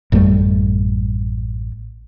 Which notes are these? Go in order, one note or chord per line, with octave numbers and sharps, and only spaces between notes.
A1 F#2 G3 A3